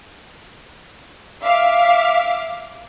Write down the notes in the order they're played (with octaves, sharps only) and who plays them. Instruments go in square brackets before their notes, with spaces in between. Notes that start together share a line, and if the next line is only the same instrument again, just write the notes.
[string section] E5 F5 D6